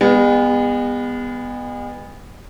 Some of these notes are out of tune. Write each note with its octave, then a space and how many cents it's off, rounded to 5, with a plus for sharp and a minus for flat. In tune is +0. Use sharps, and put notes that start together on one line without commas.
G#3 -40 B3 +0